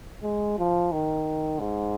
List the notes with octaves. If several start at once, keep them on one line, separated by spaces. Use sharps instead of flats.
G#3
F3
D#3
G#2